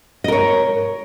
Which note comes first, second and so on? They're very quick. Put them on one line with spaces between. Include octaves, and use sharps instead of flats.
D#5 A#4 C#5